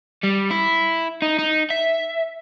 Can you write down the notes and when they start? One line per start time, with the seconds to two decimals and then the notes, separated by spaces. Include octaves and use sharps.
0.23 G3
0.50 E4
1.22 D#4
1.39 D#4
1.70 E5